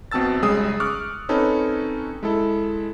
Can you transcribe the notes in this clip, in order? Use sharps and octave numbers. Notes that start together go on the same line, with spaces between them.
B1 B2 C4 A5 E6 A6
B1 C#3 G3 G#3 G#4 D#6
C#6 D6 F6 F#6
C4 C#4 D#4 A4 B4 C#5
G#3 E4 A4